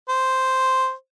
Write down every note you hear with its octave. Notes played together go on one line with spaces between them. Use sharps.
C5